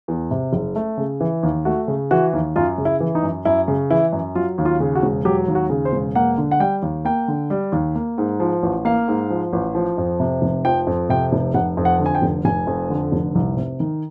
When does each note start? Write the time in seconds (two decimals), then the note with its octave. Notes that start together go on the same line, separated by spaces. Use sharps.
0.08 E2
0.31 C3
0.53 F#1
0.76 A3
0.98 C#3
1.20 E3
1.43 D#2
1.65 A3 F#4
1.88 C#3
2.11 E3 F#4
2.33 D#2
2.56 F#2 F4
2.78 C#3
2.85 E4
3.00 E3
3.15 D#4
3.23 F#2
3.45 F#2 E4
3.68 C#3
3.91 E3 E4
4.13 F#2
4.35 F#3 F4
4.58 D#2
4.65 F4
4.80 C#3
4.95 F#4
5.03 E1
5.25 F#3 G4
5.48 D#2
5.55 F#4
5.70 C#3
5.85 C5
5.93 E1
6.15 A#3 F#5
6.38 D3
6.51 F#5
6.60 G3 G5
6.82 D#2
7.05 A#3 G5
7.28 D3
7.50 G3
7.72 D#2
7.95 A#3
8.18 G#2
8.40 F3
8.63 A1
8.85 A#3 F5
9.08 G#2
9.30 F3
9.53 A1
9.75 F3
9.98 F2
10.20 C3
10.42 F1
10.64 F3 G5
10.87 F2
11.09 C3 G5
11.33 F1
11.54 F1 F#5
11.77 F2
11.85 F#5
11.99 D3
12.06 G#5
12.15 G5
12.22 F1
12.45 F1 G#5
12.67 F2
12.90 D3
13.12 F1
13.35 C2
13.57 C3
13.80 D#3